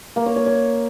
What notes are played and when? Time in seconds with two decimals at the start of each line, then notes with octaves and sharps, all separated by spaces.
0.16 A#3
0.26 C#5
0.36 C#5
0.46 C#5